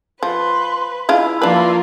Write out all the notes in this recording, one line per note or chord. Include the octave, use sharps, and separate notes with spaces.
F3 B4 C6
G#3 D4 E4 F4
F3 A#3 D4 F4 B4